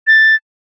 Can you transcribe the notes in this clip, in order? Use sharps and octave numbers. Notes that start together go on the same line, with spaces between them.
A6